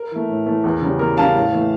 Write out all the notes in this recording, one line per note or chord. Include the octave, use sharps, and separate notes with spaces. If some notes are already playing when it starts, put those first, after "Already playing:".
Already playing: A#4
E3 A3
A2
E3 A3
E2
C#3 G3
E2 A#4
C#3 G3 F5 A5
A2
E3 A3